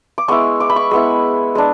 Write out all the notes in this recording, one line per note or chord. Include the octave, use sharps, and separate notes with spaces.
D6
G#3 B3 E4 C#6
D6
B5
C#6
G#3 B3 E4
G#3 D4